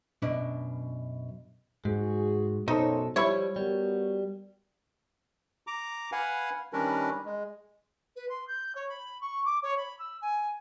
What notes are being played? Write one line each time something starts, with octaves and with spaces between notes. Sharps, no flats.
F#2 B2 D4 B4
G#2 F#4 G#4
F#2 B2 D#4 A4 C5 C#5
F3 G3 E4 C#5 B5
G3 B3 F#4 A#4
A#5 D6
B4 F5 F#5 G#5
D#3 G3 C#4 D4 A#4 B4
G#3
B4
C6
G6
C#5
B5
C#6
D6
C#5
B5
E6
G#5